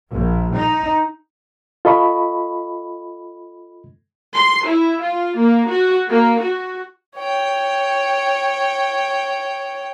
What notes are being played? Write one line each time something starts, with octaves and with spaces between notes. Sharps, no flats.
A#1
D#4
F4 A4 D#5 B5 C#6
C6
E4
F4
A#3
F#4
A#3
F#4
C#5 G5